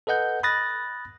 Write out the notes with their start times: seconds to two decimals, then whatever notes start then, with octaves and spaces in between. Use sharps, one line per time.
0.07 A4 B4 D#5 F#5 G6
0.43 B5 D#6 F#6 A6 A#6